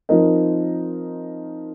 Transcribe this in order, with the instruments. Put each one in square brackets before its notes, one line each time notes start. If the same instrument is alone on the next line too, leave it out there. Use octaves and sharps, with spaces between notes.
[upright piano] F3 C4 D#4 A#4 D#5